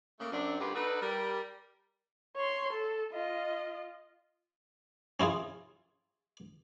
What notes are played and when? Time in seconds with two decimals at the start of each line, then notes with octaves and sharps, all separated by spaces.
0.19 C#3 A3 A#3
0.32 F#2 C4 D4
0.60 D2 G2 A#3 F4 G4 B4
0.74 D4 D#4 F#4 A4 B4
1.01 G3 A#4
2.36 C#5 C6
2.73 A4
3.13 F4 D#5
5.20 C#4 E4 F4 G#4